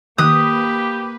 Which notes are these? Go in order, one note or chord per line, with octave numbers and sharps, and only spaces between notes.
D#3 A#3 G4 B4 D#6 F#6